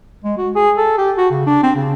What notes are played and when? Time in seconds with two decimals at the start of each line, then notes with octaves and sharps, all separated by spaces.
0.24 G#3
0.38 F#4
0.55 G#4
0.77 A4
0.98 G4
1.17 F#4
1.31 C#3
1.47 D4
1.63 C4
1.76 C#3